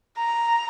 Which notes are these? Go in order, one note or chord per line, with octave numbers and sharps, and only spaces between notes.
A#5